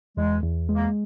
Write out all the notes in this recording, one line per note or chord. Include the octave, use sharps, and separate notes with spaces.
E2 G#3
E2
G#3
A#3